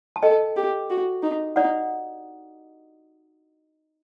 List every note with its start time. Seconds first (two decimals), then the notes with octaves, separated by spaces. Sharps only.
0.16 A5
0.23 A4 D#5 G5
0.56 G4
0.90 F#4
1.23 D#4
1.56 D#4 D5 F#5